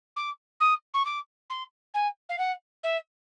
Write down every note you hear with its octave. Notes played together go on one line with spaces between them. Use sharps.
D6
D#6
C#6
D6
C6
G#5
F5
F#5
E5